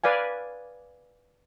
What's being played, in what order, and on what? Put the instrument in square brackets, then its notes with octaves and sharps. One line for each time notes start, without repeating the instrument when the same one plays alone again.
[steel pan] B4 D5 F5 G#5